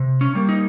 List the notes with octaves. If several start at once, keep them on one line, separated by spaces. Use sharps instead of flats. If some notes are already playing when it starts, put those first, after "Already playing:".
Already playing: C3
C#4
G3 A#3
D#4